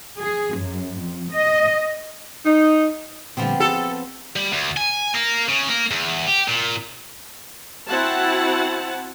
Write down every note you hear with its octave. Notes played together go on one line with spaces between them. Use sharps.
G#4
F#2
F2
D#5
D#4
A#2 D3 F3 G3 B3 C4
G#4 A4 B4 C5
G3
D2
G#5
A#3
C#3
A#3
E2
G4
A#2
C4 E4 F#4 F#5 A5